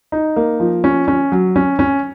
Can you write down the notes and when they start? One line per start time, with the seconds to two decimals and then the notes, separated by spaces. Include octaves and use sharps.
0.12 D#4
0.36 A#3
0.60 F3
0.84 C#4
1.08 C#4
1.32 F#3
1.56 C#4
1.79 C#4